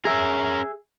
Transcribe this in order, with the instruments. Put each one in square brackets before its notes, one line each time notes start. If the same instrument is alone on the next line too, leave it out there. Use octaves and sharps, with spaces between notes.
[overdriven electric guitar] C#4 A#4 [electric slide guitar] G#4 E5